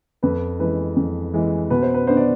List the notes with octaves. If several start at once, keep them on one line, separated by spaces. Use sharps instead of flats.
F2 B4
E3 G#3 B4
F2
E3 G#3
B2 B4
C5
B4
B3 D4 C5
D5